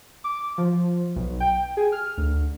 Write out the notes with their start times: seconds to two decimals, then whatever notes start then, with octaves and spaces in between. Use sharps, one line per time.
0.24 D6
0.58 F3
1.16 B1
1.40 G5
1.77 G#4
1.92 F6
2.17 D2